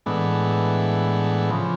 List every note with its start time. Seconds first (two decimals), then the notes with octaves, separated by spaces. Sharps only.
0.06 A2 E3 G#3 B3 D4
1.50 C#3 F3